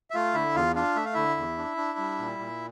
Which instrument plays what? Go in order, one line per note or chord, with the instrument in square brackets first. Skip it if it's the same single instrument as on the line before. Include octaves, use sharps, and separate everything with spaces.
[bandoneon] E5
A3 F4 F5
D3 E4 E5
E2 F4 F5
D4 F4 F5
A3 E5
F5
D3 E4 E5
E2
D4
D4
G3
A#2
A#2